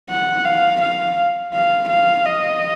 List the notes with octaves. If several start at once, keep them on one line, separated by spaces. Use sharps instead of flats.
F#5
F5
F5
F5
F5
D#5